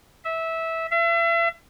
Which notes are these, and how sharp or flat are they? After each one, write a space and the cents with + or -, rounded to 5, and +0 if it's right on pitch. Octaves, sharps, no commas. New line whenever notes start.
E5 -15
E5 +40